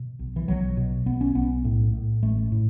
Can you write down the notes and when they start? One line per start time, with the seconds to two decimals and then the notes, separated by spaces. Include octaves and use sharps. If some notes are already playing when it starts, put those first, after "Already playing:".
Already playing: B2
0.19 B1
0.36 E3
0.48 B1 F#3
0.77 B2
1.06 B1 B3
1.21 C#4
1.35 B1 B3
1.65 A2
1.93 A2
2.23 A1 A3
2.52 A2